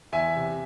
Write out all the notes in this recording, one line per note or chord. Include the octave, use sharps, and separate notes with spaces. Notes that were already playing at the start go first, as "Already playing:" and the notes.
E2 E5 G#5
C3